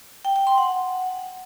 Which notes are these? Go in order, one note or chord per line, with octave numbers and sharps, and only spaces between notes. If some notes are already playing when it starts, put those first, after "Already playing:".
G5
G5
C6
F#5